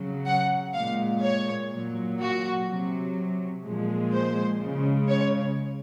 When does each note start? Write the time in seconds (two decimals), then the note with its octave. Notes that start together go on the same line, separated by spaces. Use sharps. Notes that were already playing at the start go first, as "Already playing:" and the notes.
Already playing: C#3 F#3
0.26 F#5
0.74 A#2 G#3 F5
1.23 C#5
1.72 A#2 F#3
2.20 F#4
2.68 C3 F#3
3.64 A#2 F3 G#3
4.13 C5
4.61 C#3 G#3
5.09 C#5